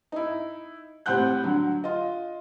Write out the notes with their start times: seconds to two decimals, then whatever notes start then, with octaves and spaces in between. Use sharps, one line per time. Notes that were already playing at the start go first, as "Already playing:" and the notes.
0.12 D#4 E4
1.06 A2 C4 G4 F#5 F#6 G6
1.44 D3 F#3
1.84 F4 D#5